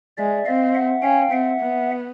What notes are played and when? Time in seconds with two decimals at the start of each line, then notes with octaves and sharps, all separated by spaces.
0.18 G#3 D5 E5
0.46 C4 D#5 F5
0.74 E5 F#5
1.02 C#4 F5 G5
1.31 C4 E5 F#5
1.60 B3